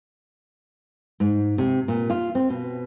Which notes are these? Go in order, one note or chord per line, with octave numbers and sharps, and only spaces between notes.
G#2
C3
A#2
F4
C4
B2